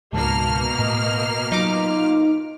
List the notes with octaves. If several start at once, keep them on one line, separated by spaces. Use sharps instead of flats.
C#2 G#2 B2 A#3 A5 F6
A2 D#5
F#3 D#4 F4 D6